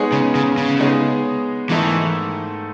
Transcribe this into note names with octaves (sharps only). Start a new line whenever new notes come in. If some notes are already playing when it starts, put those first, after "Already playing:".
Already playing: G#3 B3 D#4 G#4 C#5
C#3
C#3
C#3
G#3 B3 D#4 G#4 C#5
G#2 D#3 E3 A3 D#4 A4